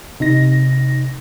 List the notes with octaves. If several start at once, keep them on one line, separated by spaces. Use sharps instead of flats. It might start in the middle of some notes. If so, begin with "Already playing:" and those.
C3 D#4 A#6